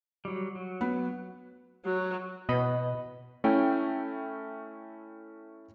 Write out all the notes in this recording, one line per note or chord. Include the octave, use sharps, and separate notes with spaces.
F#3 G3
F#3
B3
F#3
B2 B3 D#5 B5
A3 C#4 E4 G5